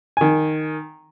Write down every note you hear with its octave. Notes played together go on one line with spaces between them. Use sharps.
D#3 G#5